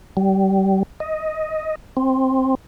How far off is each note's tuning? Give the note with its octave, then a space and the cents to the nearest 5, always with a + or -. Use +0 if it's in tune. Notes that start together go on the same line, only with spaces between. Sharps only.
G3 -25
D#5 +10
C4 +10